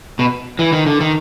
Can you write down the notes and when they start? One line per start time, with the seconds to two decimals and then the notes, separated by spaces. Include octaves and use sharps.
0.19 B2
0.59 E3
0.73 D#3
0.86 D3
1.00 D#3